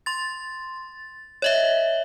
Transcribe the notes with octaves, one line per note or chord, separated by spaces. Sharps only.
C6 A6
C#5 D#5 E5